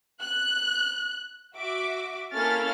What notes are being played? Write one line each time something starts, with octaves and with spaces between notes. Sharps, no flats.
F#6
F#4 E5 D6
A#3 C#4 E4 A4 F6 A6